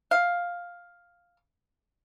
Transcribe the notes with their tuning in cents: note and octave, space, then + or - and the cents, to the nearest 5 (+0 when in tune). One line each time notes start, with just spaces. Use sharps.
F5 +5